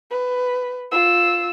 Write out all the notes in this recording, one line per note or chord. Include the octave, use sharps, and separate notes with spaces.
B4
F4 E6